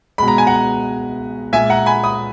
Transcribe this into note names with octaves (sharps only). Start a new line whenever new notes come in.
B2 G#3 B5
A#5
G#5
F#5 A#5
A#2 G#3 E5 G#5
F#5 A#5
G#5 B5
B5 D#6